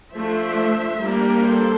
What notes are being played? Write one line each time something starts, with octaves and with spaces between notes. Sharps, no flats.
F3 A3 D4 C5 E5
G3 A#3 D4 G4 A#4
A4 C5